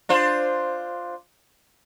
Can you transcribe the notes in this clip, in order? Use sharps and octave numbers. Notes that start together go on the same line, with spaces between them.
D4 F4 C5